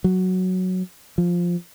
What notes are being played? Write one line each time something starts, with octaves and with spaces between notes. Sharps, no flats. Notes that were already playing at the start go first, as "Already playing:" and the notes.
F#3
F3